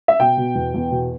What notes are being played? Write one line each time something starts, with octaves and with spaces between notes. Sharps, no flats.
E5
B2 G5
B2
E2
E2
B2